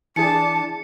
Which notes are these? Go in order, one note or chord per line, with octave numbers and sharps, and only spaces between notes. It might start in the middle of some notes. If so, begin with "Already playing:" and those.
E3 D4 E4 G#4 A5 C#7